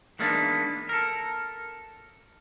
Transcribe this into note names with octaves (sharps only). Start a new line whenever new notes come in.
E3 G#3 A#3 B3 D4 D#4
A4 A#4